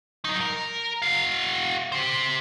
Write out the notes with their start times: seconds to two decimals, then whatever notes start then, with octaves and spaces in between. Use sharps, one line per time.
0.25 F#3 D#4
0.41 A#4
1.02 F#4 F5
1.92 G4 C5